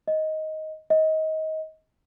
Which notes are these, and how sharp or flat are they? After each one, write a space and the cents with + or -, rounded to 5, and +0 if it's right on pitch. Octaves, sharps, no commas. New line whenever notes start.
D#5 +10
D#5 +25